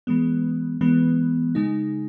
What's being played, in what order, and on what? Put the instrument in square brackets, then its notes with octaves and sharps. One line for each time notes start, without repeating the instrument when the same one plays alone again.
[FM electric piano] E3 G#3 B3
E3 G#3 B3
C#3 G#3 D#4